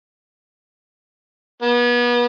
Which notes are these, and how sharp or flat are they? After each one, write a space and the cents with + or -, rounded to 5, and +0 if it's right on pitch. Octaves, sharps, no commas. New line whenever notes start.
B3 -35